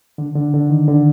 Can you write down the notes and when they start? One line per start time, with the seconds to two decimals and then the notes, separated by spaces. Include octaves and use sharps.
0.18 D3
0.35 D3
0.53 D3
0.70 D#3
0.88 D3